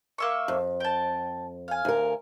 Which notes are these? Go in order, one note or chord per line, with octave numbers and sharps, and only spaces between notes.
A#3 E5 C#6
F2
G5 A5
F5 G#5
D2 A#4